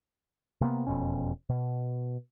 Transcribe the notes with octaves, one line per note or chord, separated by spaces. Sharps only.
C3 A#3 B3
E1 F2 B2 C#4
B2